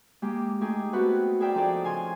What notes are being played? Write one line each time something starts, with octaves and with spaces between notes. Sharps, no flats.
G#3 A#3 G4
A3 D#4 G4 G#4
A3 B3 C4 F#4 B4
G#4 A#4 D5 E5 G5
F3 D#4 F4 G#4 A4 D5
C#3 F5 G#5 C6